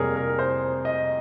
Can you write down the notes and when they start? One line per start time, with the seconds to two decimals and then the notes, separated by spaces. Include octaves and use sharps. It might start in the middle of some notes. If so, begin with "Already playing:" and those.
Already playing: F2 C3 G3 A#3 G#4 A#4 C#5
0.16 A#4
0.39 C5
0.85 D#5